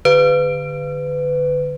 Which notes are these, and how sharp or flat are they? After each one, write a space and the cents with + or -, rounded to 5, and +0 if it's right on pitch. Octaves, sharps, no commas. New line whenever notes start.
D3 +0 B4 +25